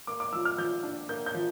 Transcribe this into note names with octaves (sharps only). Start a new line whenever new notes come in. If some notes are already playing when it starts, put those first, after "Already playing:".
A#3 D6
D6
F3 E6
F6
F3 G6
D4
A#3 G6
G6
F3